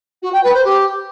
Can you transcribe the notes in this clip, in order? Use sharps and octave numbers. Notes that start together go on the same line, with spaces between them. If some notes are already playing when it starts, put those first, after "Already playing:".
F#4
G5
B4
C5
G4